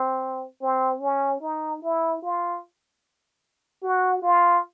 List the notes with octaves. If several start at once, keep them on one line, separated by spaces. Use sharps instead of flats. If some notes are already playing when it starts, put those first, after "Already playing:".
Already playing: C4
C4
C#4
D#4
E4
F4
F#4
F4